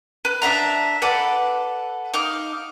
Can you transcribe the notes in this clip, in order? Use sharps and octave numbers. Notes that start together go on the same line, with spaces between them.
B4
D4 E5 F#5 A#5
A4 B4 D5 F#5
D#4 F5 D6 F#6